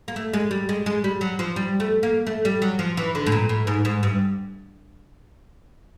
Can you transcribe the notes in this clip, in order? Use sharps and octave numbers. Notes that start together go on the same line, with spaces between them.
A#3
A3
G#3
G3
G#3
G#3
G3
F#3
F3
G3
A3
A#3
A3
G3
F#3
F3
E3
D3
A2
A#2
A2
G#2
G#2
G2